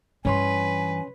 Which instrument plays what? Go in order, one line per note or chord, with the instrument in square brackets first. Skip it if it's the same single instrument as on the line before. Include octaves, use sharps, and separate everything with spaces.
[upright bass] G2 E3 [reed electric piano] C#4 C#5 C6 [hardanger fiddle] B4 [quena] G#5